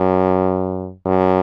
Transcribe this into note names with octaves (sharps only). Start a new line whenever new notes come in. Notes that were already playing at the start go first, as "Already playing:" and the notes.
Already playing: F#2
F#2